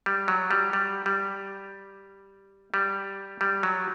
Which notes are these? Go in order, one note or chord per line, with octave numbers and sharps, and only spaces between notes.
G3
F#3
G3
G3
G3
G3
G3
F#3